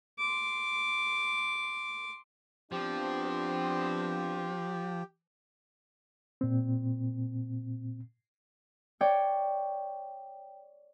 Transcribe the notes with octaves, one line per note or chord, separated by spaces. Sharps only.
C6 D6
F3 B3 C4 D4 G4
A#2 C4
C#5 D5 G5